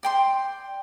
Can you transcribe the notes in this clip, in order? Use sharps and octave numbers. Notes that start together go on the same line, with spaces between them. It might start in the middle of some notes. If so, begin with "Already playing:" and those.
D5 G5 C6